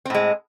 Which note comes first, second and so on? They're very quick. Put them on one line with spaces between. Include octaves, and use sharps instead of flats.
C4 A2 G#3